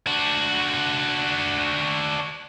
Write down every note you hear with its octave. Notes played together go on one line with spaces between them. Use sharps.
D4 F#4